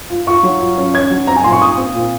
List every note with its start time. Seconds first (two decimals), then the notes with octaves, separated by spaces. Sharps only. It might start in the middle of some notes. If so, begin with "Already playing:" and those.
0.10 F4
0.27 F4 C#6
0.43 F#3
0.61 F4
0.78 C#4
0.94 C#4 G#6
1.11 F#3
1.27 C4 A#5
1.36 G#5
1.44 A#2 C6
1.52 C#6
1.61 A#2 D#6
1.78 C4
1.95 A#2